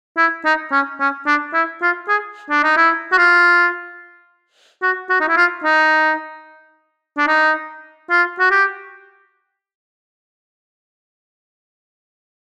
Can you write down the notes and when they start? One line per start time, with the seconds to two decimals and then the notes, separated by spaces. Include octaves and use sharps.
0.17 E4
0.45 D#4
0.72 C#4
1.00 C#4
1.27 D4
1.54 E4
1.82 F4
2.08 G#4
2.50 D4
2.63 D#4
2.77 E4
3.12 F#4
3.18 F4
4.82 F#4
5.09 F#4
5.20 D#4
5.28 E4
5.37 F4
5.64 D#4
7.18 D4
7.28 D#4
8.10 F4
8.40 F#4
8.51 G4